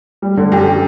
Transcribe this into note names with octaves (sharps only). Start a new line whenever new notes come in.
G3
D3
F#2 G4
G4